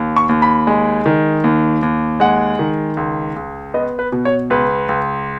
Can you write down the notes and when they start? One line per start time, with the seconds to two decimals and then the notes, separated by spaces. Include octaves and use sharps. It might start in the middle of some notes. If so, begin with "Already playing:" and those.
Already playing: D#2
0.16 C#6
0.29 D#2
0.42 B5
0.67 G#3
1.06 D#3
1.44 D#2
1.82 D#2
2.20 G#3 F#5
2.59 D#3
2.97 C#2
3.36 C#2
3.74 B3 D#5
3.99 B4
4.12 B2
4.25 C#5
4.50 C#2 B4
4.89 C#2